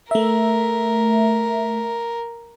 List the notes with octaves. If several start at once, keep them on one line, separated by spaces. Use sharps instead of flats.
A3 A#4 E5